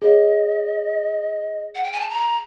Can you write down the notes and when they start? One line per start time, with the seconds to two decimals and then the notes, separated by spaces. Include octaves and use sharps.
0.02 G#4 C#5 D#5 F5
1.75 F#5
1.83 G5
1.92 G#5
2.00 A5
2.09 A#5